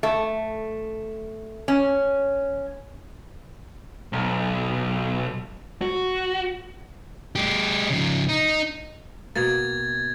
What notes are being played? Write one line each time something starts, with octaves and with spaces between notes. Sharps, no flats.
A3
C#4
B1
F#4
G#3 G4
C#3 F3
D#4
B2 A#3 G#6 A6